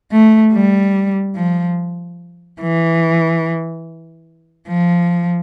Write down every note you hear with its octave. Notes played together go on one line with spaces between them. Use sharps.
A3
G3
F3
E3
F3